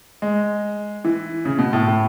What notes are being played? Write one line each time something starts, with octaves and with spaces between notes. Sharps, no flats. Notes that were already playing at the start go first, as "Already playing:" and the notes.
G#3
E3
C#3
B2
A2
A2